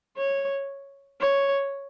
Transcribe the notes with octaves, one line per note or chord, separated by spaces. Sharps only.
C#5
C#5